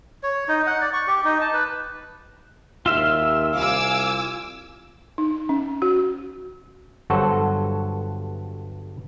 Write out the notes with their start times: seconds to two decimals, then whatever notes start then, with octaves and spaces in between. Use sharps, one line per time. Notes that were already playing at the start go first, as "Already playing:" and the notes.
0.23 C#5
0.48 D#4
0.67 F#5
0.81 D5
0.93 C#6
1.07 G4
1.24 D#4
1.41 A5
1.53 B4
2.86 D#2 F4 E5 E6 F6
3.55 C2 F5 G#5 D6 E6
5.18 D#4
5.49 C#4
5.82 F#4
7.10 G1 G2 F#3 F#4 A4 C5